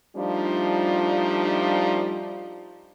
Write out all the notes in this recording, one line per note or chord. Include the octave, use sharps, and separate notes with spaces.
F3 G3 A3 D4 D#4 F4